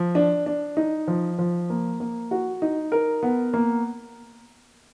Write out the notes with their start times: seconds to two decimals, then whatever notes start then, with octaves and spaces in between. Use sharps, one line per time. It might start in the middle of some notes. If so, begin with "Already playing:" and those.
Already playing: F3
0.15 D4
0.46 D4
0.77 D#4
1.07 F3
1.38 F3
1.70 A#3
2.00 A#3
2.31 F#4
2.62 D#4
2.92 A#4
3.23 B3
3.54 A#3